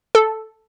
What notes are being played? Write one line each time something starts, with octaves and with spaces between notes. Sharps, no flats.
A4